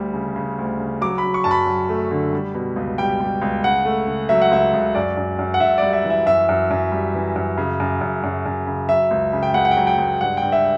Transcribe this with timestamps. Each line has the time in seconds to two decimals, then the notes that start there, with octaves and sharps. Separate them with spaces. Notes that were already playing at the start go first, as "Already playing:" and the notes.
Already playing: D2 G3
0.14 C#3
0.36 C#3
0.58 D2
0.80 C#3
1.01 F#3 D6
1.18 F#3 B5
1.34 C#6
1.44 F#2 A5
1.51 B5
1.66 F#3
1.89 A3
2.11 D3
2.32 G3
2.54 B2
2.76 C#2
2.98 G3 G5
3.20 G3
3.42 C#2
3.64 C#3 F#5
3.85 A3
4.07 C#3
4.29 F#3 E5
4.42 F#5
4.51 C#2 E5
4.73 C#2
4.95 F#2 D5
5.17 F#2
5.39 F#2
5.54 F#5
5.60 F#2 E5
5.78 G3 D5
5.93 E5
6.04 E3
6.10 E5
6.26 F#2 E5
6.49 F#2
6.71 F#2
6.92 G3
7.14 E3
7.36 F#2
7.58 C#3
7.80 F#2
8.01 F#2
8.24 F#2
8.46 F#2
8.67 C#3
8.89 F#3 E5
9.11 C#2
9.33 C#3
9.43 G5
9.54 C#2 F#5
9.65 F#5
9.71 G5
9.77 F#3
9.87 G5
9.98 C#2
10.21 G2 F#5
10.37 G2 G5
10.52 E5